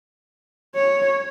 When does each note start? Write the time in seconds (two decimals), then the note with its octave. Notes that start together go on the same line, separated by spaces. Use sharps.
0.75 C#5